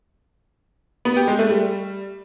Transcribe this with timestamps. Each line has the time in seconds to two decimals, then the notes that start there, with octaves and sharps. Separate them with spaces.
1.05 B3
1.16 G4
1.28 G#3
1.39 A3
1.50 G3